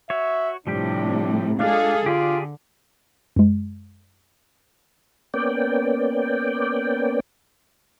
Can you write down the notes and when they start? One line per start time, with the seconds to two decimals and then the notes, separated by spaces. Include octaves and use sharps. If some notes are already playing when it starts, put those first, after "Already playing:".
0.10 F#4 C#5 E5
0.67 A2 C3 F3 G3 D4 G4
1.60 G#3 D4 F4 G#4 A4 D5 F5
2.06 D3 F4 G4 G#4 D5
3.36 F#2 G#3
5.34 A#3 B3 C#4 D5 G5